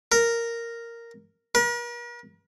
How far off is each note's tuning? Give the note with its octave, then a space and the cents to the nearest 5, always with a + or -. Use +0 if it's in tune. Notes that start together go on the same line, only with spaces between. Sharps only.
A#4 -5
A#4 +45